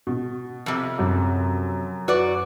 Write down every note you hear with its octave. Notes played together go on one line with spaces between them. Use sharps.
B2
F2 C3
F#2
F#4 B4 D5